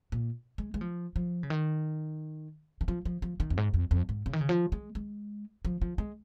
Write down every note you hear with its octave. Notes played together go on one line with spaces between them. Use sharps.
A#2
G#3
G#3
F3
F3
C#3
D#3
D#3
F3
F3
F3
D#3
F2
G#2
F2
F2
G#2
C#3
D#3
C#3
F3
G#3
G#3
F3
F3
G#3